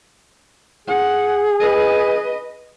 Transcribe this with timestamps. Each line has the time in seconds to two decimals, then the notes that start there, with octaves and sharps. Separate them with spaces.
0.88 G#4 F#5
1.60 B4 D#5